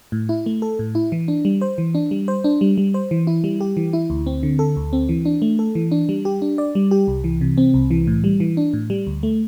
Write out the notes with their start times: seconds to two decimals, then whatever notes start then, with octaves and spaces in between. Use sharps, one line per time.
0.12 A2
0.29 E4
0.46 A3
0.62 A4
0.79 A2
0.95 E4
1.12 E3
1.28 D4
1.45 G3
1.61 C5
1.78 E3
1.95 D4
2.11 G3
2.28 C5
2.44 D4
2.61 G3
2.78 G3
2.94 C5
3.11 E3
3.27 E4
3.44 G3
3.61 G4
3.77 E3
3.93 E4
4.10 D2
4.27 C4
4.43 D3
4.59 A4
4.77 D2
4.93 C4
5.09 E3
5.25 D4
5.42 A3
5.59 A4
5.75 E3
5.92 D4
6.09 G3
6.25 G4
6.42 D4
6.58 D5
6.75 G3
6.91 G4
7.08 C2
7.24 E3
7.41 C3
7.58 C4
7.74 C2
7.91 E3
8.07 A2
8.24 G3
8.40 E3
8.57 D4
8.73 A2
8.90 G3
9.07 D2
9.23 A3